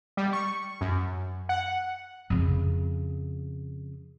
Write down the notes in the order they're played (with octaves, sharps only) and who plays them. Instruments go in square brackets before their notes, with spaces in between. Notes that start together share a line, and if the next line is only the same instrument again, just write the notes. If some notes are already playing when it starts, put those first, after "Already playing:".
[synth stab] G3
C#6
F#2
F#5
[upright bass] F2 C#3